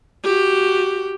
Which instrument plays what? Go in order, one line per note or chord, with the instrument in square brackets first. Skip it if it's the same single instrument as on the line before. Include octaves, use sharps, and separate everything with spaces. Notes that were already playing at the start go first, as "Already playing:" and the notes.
[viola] F#4 G4